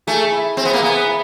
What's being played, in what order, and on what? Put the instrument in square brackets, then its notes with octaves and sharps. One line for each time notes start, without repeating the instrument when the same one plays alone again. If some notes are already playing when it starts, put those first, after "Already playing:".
[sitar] A3 [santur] G#4
[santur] E4
[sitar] C4 [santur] G#4
[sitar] B3
A#3
[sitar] B3 [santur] G#4
[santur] E4